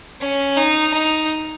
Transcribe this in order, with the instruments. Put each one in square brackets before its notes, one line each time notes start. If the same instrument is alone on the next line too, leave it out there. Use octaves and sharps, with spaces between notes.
[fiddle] C#4
D#4
D#4